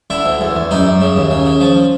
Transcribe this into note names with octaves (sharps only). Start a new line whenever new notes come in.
D3 E4
D2
E2
E2
F#2 D#4
F#2
C#3
D#2
C#3
C#3
F3